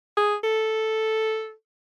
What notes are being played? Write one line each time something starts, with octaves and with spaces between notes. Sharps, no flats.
G#4
A4